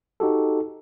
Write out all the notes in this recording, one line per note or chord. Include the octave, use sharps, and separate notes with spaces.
D#4 F#4 G4 A4